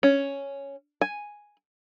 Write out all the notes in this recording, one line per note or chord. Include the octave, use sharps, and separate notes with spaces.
C#4
G#5